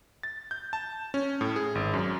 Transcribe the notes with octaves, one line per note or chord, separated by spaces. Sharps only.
A6
G6
A5
C#4
A2
G#4
G#1
F#2